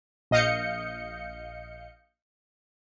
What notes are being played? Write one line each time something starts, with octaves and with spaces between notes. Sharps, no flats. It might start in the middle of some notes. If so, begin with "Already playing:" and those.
A#1 D#5 F5 G6 C#7